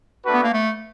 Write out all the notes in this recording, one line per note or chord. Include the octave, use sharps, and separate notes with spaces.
A3 D4 F#4 B4
B3
A#3
A3